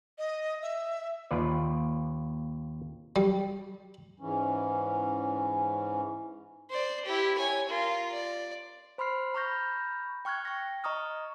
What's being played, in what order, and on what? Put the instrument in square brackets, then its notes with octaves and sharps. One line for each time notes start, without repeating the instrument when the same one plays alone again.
[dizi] D#5
E5
[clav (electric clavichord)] D#2 F4 B4 D5
[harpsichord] G3
[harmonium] G#2 E3 C#4
[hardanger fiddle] C5 D5
E4 G4
C#5 G#5
F4 A#4
D5
[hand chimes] C5 B5 C6 F6 C7
A#5 B5 C#6 F6 G6 A#6
G5 C#6 F6 F#6 G#6
C#6 A#6
D#5 A#5 C#6 D#6 F6